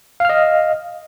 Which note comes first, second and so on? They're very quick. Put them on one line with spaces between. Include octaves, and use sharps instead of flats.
F5 F6 D#5